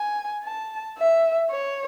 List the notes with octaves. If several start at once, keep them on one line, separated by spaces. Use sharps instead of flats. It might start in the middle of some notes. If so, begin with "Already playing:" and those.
Already playing: G#5
A5
E5
C#5